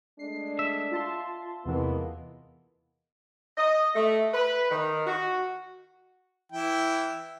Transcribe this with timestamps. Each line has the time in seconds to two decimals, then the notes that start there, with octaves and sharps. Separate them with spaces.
0.19 G#3 A3 D4 C7
0.59 E5
0.91 F4 A5 C6
1.66 E2 C3 E3 G#3 A#3 B3
3.56 D#5
3.95 A3
4.32 B4
4.70 D#3
5.06 F#4
6.52 E3 E4 G5